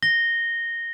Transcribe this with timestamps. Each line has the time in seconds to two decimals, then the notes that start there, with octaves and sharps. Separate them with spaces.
0.03 A#6 G7